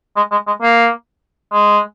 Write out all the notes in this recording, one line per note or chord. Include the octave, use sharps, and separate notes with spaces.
G#3
G#3
G#3
A#3
G#3